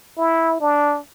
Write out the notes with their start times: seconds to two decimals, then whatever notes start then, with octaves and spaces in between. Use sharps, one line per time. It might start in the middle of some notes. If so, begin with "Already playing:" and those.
0.18 E4
0.60 D4